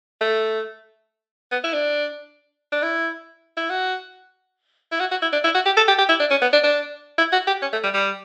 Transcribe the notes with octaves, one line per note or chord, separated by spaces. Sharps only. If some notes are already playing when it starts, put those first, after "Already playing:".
A3
B3
E4
D4
D4
E4
E4
F#4
E4
F#4
F#4
E4
D4
E4
F#4
G4
A4
G4
G4
E4
D4
C#4
B3
D4
D4
E4
F#4
G4
C#4
A3
G3
G3